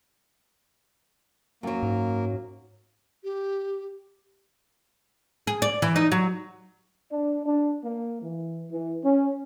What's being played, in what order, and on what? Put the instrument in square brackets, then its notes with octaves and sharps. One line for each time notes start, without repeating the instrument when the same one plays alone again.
[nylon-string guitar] F#2 F#3 [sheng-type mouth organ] A#3
[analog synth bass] G#2
[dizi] G4
[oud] G#4
D5
E3
D#4
F#3
[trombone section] D4
D4
A#3
E3
E3
C#4